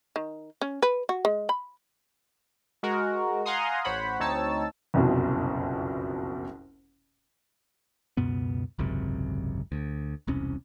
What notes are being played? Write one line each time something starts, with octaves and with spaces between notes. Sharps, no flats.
D#3
C#4
B4
F#4
G#3
B5
G#3 F#4 A#4
F5 F#5 G#5 A#5 C6 D#6
A1 C5 C#5 F#5 B5
D2 C4 D#4 C#5 A5 E6
F#1 C2 F2 B2
C#2 F#2 B2 B3
G#1 C#2 F#2 C3
D2
E1 C2 C3 C#4